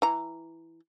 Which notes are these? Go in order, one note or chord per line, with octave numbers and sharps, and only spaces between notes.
E3 A#5